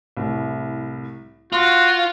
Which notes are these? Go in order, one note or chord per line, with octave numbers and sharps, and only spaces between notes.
C2 A2
F4 F#4 C6